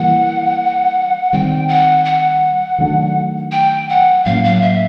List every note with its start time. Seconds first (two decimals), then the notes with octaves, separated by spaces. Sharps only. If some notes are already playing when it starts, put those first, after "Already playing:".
Already playing: E3 G3 A#3 F#5
1.33 D#3 G3 C4 G5
1.69 F#5
2.05 F#5
2.78 D#3 F#3 A3 D4
3.52 G5
3.89 F#5
4.25 A2 F#3 A#3 C#4 F5
4.44 F5
4.62 E5